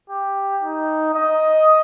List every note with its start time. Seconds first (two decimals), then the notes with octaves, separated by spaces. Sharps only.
0.10 G4
0.63 D#4
1.15 D#5